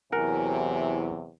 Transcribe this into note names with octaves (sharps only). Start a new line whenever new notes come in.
E2 C3 F#3 E4 A#4 F#5 G#5